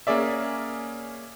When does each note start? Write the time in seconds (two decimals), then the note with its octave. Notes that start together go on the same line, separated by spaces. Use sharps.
0.07 A#3 C#4 G#4 D5 E5